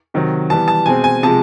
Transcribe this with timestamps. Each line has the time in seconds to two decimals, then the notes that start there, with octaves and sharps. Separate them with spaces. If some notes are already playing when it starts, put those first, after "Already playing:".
0.14 C3 D#3 F#3
0.50 E3 G3 B3 A5
0.68 A5
0.86 B2 G#3 C4 G#5
1.04 G#5
1.23 C3 F3 G#3 A5